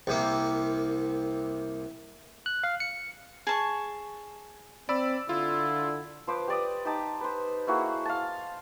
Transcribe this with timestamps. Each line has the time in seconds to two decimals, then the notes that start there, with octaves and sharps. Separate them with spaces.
0.07 C2 C3 A#3
2.46 F#6
2.64 F5
2.80 C#7
3.47 G#4 A5 C#6
4.89 C4 D5 B5 E6
5.29 D3 E4 F4
6.27 F3 B4 C5 D6
6.48 G4 D5 D#6
6.85 D#4 G4 A5
7.21 B4 C5
7.67 A#3 E4 F#4 G#4
8.05 F5 A5